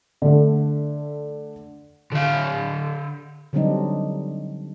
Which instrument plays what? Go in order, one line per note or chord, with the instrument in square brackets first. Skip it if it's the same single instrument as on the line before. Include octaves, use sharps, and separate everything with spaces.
[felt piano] D3 A3
[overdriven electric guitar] D3 F5
[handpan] D3 F#3 G3 C4 D4 D#4